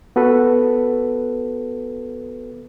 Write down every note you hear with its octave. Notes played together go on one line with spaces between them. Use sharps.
B3 F#4 A4 B4